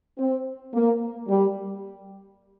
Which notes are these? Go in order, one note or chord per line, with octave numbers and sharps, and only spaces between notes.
C4
A#3
G3